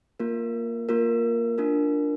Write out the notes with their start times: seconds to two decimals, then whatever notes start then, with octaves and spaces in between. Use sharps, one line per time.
0.20 A#3 F4 A#4
0.89 A#3 F4 A#4
1.58 D4 F4 A#4